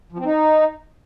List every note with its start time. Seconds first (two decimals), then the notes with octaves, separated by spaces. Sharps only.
0.12 F3
0.19 C4
0.25 D#4